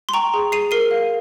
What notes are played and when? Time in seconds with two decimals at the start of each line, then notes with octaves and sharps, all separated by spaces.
0.09 C6
0.14 G5 A#5 C#6
0.34 G#4
0.52 G#4 C7 D#7
0.71 A#4 C7 D#7
0.91 F5